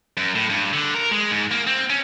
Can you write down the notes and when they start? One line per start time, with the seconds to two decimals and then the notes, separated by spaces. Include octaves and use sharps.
0.17 F#2
0.35 A2
0.50 G2
0.73 D3
0.94 A#4
1.11 G#3
1.31 G#2
1.51 A#3
1.67 C4
1.90 C#4